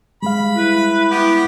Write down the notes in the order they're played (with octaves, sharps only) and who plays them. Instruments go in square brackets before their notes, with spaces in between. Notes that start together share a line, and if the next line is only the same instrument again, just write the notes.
[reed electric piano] G3 G#3 F5 [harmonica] B5
[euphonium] E4 [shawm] B4
[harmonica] B3 [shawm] G4